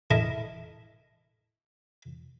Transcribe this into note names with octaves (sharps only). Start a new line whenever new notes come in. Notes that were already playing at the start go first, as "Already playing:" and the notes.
E4 A4 A#4 D#5 E5